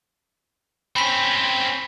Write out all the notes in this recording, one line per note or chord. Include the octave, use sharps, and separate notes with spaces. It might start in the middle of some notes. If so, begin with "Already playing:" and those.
C4 C#4 B5 B6